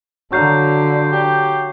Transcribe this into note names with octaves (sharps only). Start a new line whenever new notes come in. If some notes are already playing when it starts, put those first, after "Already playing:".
D3 F#3 F5 C#6 G6 C7
G4